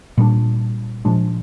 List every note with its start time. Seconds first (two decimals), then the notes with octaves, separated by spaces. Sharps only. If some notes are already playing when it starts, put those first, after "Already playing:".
0.17 A#2 G3 A#3 D4
1.05 A#2 F3 G#3 D4